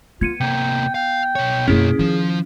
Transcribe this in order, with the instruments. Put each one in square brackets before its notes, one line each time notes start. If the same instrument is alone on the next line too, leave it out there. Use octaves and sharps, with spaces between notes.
[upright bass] B3 [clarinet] F4 [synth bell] G#6 C#7 D#7
[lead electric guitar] C3 A#3 [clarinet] G5
[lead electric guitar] F5 [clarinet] G5
[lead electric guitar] B2 C#5
[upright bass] F#2 A#3 [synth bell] C#4 E4 [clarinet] G#4
[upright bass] D#3 [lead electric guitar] F3